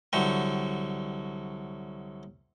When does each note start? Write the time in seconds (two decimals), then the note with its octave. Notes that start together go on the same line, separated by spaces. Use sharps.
0.13 C2 D3 F#3 G5